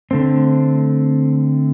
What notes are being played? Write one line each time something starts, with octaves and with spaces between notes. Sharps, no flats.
D3 A3 C4